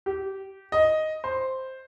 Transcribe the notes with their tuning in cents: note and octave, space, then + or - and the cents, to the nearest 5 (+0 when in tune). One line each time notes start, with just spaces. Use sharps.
G4 -20
D#5 +5
C5 +0